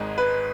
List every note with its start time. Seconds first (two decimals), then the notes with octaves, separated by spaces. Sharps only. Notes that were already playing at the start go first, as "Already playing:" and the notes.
Already playing: G#1 G#2 G#3
0.18 B4